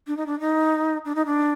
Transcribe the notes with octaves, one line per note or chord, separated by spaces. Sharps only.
D4
D#4
D4
D#4
D4
D#4
D4